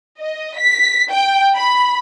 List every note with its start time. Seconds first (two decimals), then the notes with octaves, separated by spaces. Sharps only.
0.20 D#5
0.58 B6
1.12 G5
1.57 B5